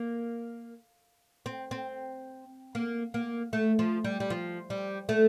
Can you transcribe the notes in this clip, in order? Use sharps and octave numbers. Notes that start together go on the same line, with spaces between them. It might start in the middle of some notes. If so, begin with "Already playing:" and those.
Already playing: A#3
C4
C4
A#3
A#3
A3
F3
G3
G3
F3
G3
A3